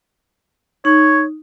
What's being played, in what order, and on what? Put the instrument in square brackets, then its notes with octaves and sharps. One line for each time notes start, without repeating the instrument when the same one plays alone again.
[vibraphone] D#4 [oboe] C#5